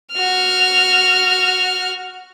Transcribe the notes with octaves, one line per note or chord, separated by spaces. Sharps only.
F#4 F6